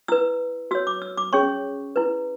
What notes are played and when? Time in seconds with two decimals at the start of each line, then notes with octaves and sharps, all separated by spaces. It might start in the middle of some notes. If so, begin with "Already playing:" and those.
0.08 E4 B4 E6
0.71 F#4 E6
0.75 C#5
0.87 D6
1.02 E6
1.17 D6
1.33 C#4 G#4 C#5 C#6
1.96 E4 B4